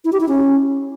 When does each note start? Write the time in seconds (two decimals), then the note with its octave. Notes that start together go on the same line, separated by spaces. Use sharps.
0.05 E4
0.13 G4
0.21 E4
0.28 C#4